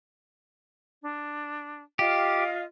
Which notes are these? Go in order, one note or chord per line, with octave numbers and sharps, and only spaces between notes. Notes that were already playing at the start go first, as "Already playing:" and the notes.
D4
F4 G4 D#5 F5